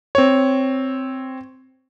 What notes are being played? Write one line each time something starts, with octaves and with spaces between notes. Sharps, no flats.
C4 C#5